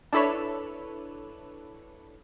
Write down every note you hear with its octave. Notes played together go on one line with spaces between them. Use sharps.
D4 E4 A4 B4 C#5